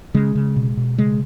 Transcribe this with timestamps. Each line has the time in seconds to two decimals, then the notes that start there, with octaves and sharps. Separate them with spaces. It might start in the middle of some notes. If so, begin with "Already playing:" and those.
0.14 C#3 G#3
0.35 C#3
0.56 B2
0.77 B2
0.98 C#3 G#3